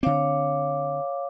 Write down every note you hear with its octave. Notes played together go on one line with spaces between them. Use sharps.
D3 C4 C#5 F5 D6